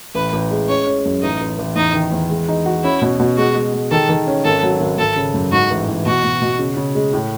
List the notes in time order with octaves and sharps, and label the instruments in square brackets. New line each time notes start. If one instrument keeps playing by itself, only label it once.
[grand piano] A1 [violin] B4
[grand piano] A1
G#3
[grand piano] C#4 [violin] C#5
[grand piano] C#4
F#2
[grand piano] A1 [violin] D#4
[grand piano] A1
A1
[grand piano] E2 [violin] D#4
[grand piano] D#3
E2
G#3
D#4
F#4
[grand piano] C#4 [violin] E4
[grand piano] B2
B2
[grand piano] G#3 [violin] F#4
[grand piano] G#3
G#3
[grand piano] D#3 [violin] A4
[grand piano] D#3
C#4
[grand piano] G#1 [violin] A4
[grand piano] F#3
G#1
[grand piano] G#1 [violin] A4
[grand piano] C#3
F#2
[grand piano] G#2 [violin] F#4
[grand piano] A1
E3
[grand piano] B2 [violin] F#4
[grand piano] B2
B2
C#3
C#3
G#3
A2